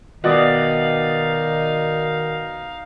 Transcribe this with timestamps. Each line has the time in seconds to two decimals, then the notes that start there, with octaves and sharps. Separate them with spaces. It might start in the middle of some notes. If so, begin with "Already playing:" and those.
0.24 B2 D#3 D#4 D5 D#5 F5 F#5